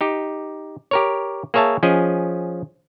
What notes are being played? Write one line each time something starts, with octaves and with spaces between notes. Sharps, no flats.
D#4 G4
G4 A#4 C#5
A#3 G#4 C#5 E5 A5
F3 C#4 G#4 D#5